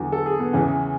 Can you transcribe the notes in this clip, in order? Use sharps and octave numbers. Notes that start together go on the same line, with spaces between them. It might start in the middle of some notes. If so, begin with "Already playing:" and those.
Already playing: E2 D3 F#3
A4
G#4
B3
E2 C#3 E3 C#4